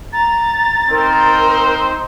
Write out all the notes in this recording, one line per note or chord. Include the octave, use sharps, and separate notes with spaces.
A#5 A6
C4 D#4 A#4 C5